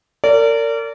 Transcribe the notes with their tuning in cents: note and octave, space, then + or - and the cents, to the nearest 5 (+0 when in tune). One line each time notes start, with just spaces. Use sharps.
A#4 -35 D5 -30